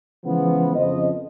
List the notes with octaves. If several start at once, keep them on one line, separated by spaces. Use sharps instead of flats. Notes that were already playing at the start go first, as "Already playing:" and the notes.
C#3 E3 F3 G#3 B3
F2 C#3 F3 C5 D#5